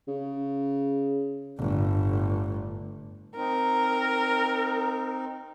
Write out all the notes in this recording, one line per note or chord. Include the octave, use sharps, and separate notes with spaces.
C#3
G1 A2
C4 D#4 A#4